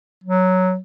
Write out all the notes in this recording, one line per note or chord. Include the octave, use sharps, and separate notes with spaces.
F#3